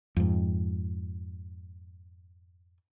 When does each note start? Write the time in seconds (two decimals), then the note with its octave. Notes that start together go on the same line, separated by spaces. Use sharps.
0.16 F2 G#2